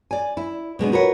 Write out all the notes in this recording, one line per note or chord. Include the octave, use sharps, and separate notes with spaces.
D5 G#5
E4
B2 G#3 B3 D4
F4 F#4 A#4 B4 C#5 F#5